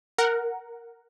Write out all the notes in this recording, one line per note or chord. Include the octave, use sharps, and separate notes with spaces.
A#4 F#5